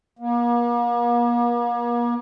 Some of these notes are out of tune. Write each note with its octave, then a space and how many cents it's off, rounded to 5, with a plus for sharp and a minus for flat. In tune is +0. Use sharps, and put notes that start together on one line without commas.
A#3 +40